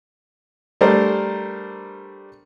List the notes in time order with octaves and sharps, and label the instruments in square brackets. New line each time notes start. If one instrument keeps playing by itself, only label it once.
[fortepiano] G3 A3 D4 A#4 C5